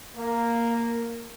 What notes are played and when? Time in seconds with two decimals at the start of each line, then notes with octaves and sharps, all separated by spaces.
0.17 A#3